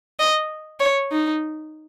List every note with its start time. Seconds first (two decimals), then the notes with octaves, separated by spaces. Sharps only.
0.20 D#5
0.80 C#5
1.12 D#4